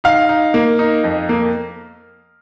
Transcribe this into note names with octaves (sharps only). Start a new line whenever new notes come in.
D#4 F5
D#4
A#3
D#4
F2
A#3